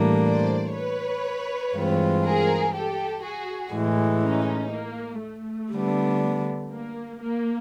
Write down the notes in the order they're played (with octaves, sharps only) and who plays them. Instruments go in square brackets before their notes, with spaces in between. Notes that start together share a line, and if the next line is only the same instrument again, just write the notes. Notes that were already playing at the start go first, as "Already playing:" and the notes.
Already playing: [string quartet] A2 E3 G3 A#3 D4
[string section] C5 D5
B4 C#5
[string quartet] G2 E3 G#3 C4 F4
[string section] G#4 A#4
G4 A4
F#4 G#4
[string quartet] A2 E3 G#3
[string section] C#4 D#4
A#3
A3
[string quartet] D3 G3 B3 D4
[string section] A#3
A#3